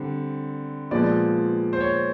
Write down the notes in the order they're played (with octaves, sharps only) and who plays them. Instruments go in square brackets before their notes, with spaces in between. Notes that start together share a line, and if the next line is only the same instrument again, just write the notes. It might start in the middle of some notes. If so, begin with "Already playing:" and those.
Already playing: [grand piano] D3 G3 C4
A#2 F3 G#3 B3 D5
C5
C#5